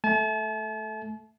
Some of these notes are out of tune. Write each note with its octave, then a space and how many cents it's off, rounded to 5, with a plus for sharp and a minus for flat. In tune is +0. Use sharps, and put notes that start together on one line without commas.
A3 -10 A5 -40